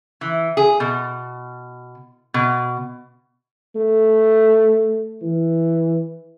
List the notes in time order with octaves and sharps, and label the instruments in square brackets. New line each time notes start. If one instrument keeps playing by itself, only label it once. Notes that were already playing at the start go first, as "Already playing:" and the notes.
[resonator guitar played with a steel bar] E3
G#4
B2
B2
[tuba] A3
E3